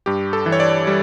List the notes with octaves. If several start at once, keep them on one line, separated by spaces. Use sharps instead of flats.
G2 G4
A4
E3
C#5
D5
G3